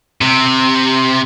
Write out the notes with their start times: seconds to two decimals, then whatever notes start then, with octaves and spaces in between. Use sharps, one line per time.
0.21 C3